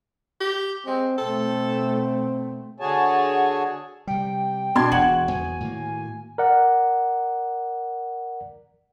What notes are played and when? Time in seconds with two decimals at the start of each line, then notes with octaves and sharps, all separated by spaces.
0.40 G4
0.87 G#3 C4
1.18 B2 A3 C4 A4
2.80 D3 F#4 G#4 C#5 G#5 A5
4.07 C3 G3 G5
4.75 B2 D4 C6 G#6
4.92 E1 F#4 F#7
5.29 E2 B3 G#5
5.60 A2 D#3 A#3
6.38 A#4 D5 F#5